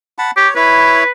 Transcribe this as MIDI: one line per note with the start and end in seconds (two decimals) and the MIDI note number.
0.18 0.31 78
0.18 0.31 81
0.18 0.31 83
0.37 0.48 67
0.37 0.54 73
0.55 1.04 64
0.55 1.09 71
0.55 1.04 73